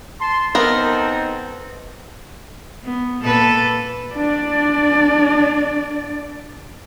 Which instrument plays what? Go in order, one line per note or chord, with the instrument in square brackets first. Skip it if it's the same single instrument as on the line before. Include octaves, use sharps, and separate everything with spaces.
[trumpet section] A5 C6
[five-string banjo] B3 A#4 [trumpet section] C4 D#4 A4
[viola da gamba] B3
A#2 A4 B4
[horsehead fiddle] D4 D5